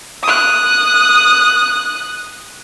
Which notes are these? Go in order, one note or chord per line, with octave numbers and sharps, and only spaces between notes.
D#6 F#6